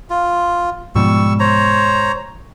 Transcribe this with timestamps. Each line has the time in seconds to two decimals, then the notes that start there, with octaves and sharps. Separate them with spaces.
0.10 F4
0.95 G#2 B2 F3 G3 C#6 E6
1.40 C5 C#5 A#5